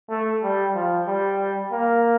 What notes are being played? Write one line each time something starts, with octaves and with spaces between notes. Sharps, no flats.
A3
G3
F3
G3
A#3